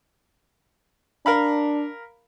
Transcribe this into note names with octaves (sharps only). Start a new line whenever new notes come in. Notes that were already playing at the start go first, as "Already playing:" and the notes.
D4 A#4 F5 B5